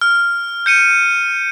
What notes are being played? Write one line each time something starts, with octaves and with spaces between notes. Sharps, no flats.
F6
G6 C#7 D#7